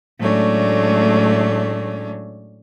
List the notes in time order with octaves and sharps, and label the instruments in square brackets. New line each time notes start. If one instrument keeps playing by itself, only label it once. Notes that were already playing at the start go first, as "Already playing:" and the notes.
[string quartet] A2 F#3 G#3 A3 C#4 D4